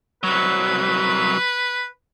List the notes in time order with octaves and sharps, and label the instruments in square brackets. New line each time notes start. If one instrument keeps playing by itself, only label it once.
[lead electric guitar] C2 F#3 [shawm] B4